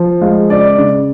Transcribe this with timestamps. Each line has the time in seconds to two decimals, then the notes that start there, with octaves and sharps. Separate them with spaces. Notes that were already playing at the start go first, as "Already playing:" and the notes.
Already playing: F3
0.22 G#3 F5
0.50 C#3 D5
0.78 C#3